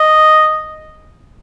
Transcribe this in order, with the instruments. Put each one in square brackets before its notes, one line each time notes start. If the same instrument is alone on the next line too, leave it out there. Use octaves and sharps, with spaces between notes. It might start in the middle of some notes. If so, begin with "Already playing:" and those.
Already playing: [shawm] D#5